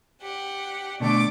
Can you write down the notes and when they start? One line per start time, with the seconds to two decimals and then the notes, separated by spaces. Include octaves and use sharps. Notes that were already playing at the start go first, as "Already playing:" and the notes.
0.22 G4 F#5
1.00 B2 D3 A3 D5 D6